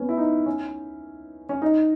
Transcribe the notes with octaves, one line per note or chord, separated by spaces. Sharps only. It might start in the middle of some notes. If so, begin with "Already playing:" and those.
Already playing: B3 C#4
E4
D#4
C#4
C#4
D#4